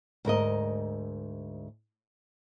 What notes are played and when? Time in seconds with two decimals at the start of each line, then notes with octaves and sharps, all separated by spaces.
0.25 D2 G#2 A#4 D#5